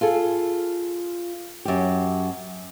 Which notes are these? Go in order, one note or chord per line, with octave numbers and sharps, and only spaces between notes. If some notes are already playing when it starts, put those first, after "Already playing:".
F4 G#4 A4
F#2 G4